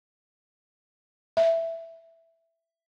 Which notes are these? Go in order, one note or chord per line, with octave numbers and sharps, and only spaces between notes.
E5